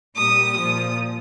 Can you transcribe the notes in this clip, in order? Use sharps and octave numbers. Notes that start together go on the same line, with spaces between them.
A#2 G3 D#6
A#2 F3 D#6